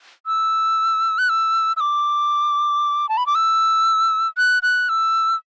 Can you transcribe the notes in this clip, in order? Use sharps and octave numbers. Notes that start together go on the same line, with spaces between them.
E6
F#6
E6
E6
D6
A5
B5
D6
E6
F#6
F#6
E6